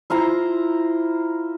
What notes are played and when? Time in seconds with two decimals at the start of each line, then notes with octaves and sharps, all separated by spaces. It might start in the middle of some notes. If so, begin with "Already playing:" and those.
0.10 E4 F4 C5 A#5